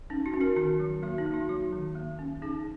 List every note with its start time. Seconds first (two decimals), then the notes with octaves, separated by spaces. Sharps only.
0.10 C#4 D#4
0.26 F#4
0.33 C#4
0.41 F#4 A#4
0.56 D#3 F#4
0.79 F#3
1.03 A#3 F#4
1.18 D#4
1.26 A#3
1.34 F#4
1.49 F#3 F#4
1.73 D#3
1.95 A#3
2.19 C#4
2.42 C#4 D#4 G#4